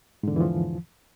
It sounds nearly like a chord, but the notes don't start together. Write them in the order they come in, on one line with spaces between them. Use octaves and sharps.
G#2 D3 E2 E3 F3